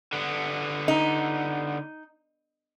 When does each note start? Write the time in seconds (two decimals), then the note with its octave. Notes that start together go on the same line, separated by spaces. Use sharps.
0.13 D3 B3
0.88 D#4